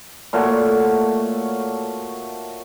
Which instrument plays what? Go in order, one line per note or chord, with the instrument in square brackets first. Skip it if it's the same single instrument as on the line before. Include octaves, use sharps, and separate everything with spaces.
[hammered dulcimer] A#2 A3 F#4 C#5